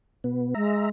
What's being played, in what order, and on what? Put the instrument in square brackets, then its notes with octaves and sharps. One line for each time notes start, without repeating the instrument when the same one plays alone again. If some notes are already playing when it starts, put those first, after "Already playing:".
[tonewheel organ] B2 B3
[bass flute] G#3 [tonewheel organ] E5 A#5